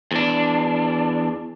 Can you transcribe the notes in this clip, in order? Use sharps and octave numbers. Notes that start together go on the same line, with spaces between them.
E2 D4